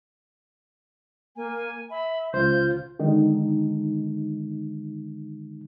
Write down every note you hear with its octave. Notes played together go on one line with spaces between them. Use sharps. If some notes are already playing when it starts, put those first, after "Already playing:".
A#3 G#5
E5 B5
C#2 F4 C5 G6
D3 D#3 G#3 D#4